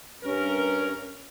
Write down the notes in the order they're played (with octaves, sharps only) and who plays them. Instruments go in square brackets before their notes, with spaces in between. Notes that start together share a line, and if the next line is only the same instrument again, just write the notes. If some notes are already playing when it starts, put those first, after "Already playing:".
[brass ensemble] G2 A#4 [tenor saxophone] C#4